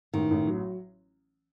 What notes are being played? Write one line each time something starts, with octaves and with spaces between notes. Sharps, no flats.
A1 D#3
A1
F#3